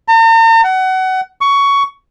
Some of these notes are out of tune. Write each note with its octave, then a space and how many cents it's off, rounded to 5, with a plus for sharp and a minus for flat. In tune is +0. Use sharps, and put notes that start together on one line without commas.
A#5 -45
F#5 +25
C#6 +15